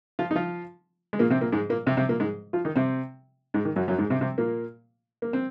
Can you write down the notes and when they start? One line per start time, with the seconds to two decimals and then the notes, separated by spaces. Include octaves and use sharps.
0.19 F3 F4
0.31 D#4
0.36 F3 F4
1.13 G#3
1.19 A#2 A#3
1.30 C3 C4
1.41 A#2 A#3
1.52 G#2 G#3
1.70 A#2 A#3
1.86 C3 C4
1.97 C3 C4
2.09 A#2 A#3
2.20 G#2 G#3
2.53 F3 F4
2.65 D#3 D#4
2.76 C3 C4
3.54 G#2 G#3
3.65 D#3
3.76 F#2 F#3
3.88 F#2 F#3
3.98 G#2 G#3
4.10 C3 C4
4.21 C3 C4
4.38 A#2 A#3
5.22 A#3
5.33 C4